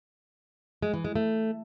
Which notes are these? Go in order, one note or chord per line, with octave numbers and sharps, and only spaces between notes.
G#3
E3
G#3
A3